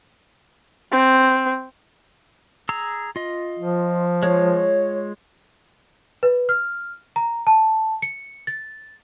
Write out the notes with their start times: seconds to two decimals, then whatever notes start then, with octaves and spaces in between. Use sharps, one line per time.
0.92 C4
2.69 G#4 A#5 E6
3.16 F4 D#5
3.59 F3
4.23 G#3 F4 C#5
6.23 B4
6.49 F6
7.16 A#5
7.47 A5
8.02 C#7
8.47 A6